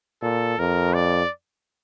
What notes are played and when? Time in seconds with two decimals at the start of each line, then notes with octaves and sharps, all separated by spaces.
0.22 A#2 A4
0.58 F2 A#4
0.94 D5